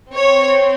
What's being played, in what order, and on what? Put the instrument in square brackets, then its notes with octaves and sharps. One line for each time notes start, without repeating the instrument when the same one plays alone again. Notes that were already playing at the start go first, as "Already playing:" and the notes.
[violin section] C4 C#5